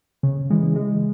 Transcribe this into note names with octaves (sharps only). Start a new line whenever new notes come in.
C#3
E3 G#3
G#3